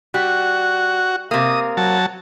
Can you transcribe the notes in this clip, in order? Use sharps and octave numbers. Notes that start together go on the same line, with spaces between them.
G3 F#4
C3 A#3 D#6
F#3 A5